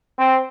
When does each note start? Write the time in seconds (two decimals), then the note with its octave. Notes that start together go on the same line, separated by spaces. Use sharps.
0.18 C4